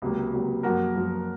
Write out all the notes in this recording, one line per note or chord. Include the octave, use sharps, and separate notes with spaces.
C#2 C3 F#3 A#3
C#2 C3 F#3 A#3
F#2 F3 A#3 F#4 A#4
F#2 F3 A#3